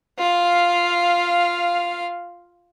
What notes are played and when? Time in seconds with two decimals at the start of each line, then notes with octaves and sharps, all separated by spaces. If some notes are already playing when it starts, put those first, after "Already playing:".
0.19 F4 F5